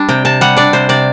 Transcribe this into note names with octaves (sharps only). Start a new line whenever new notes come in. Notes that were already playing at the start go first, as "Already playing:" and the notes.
Already playing: G3 D4
C3 G5
C3 A5
G3 F#5
D4 D5
C3 C5
C3 D5